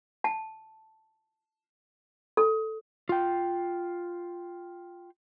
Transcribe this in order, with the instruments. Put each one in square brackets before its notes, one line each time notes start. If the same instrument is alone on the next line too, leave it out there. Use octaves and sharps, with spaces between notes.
[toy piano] A5
A4
[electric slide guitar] F4 G5